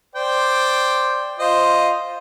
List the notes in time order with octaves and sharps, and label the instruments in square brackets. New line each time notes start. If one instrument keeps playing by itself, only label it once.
[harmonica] C5 D5 G5
F4 C5 D#5